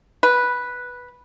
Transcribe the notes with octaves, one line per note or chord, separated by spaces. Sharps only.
B4